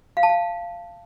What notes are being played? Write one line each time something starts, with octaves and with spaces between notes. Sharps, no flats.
F5
A5
F5